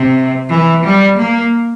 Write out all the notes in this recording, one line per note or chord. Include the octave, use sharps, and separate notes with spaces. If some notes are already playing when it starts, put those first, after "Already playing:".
Already playing: C3
E3
G3
A#3